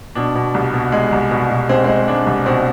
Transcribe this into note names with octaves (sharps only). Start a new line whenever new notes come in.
B2 D4
B2
C2
B2
G#3
C2
B2
B2
G#3 C4
G#3 C4
G#3 D4
C2
B2 C4